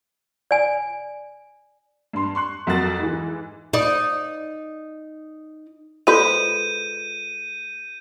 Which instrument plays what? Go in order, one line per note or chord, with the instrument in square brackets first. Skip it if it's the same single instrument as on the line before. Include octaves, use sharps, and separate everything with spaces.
[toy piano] D5 G#5
[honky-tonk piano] G2 C6
C6 C#6 F#6
F2 F#3 F#4 A#4 F#6 A6
G#2 E3
[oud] D#4 D5
[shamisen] G#3 B4 C5 [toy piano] F4 A4 D5 [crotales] G6 D#7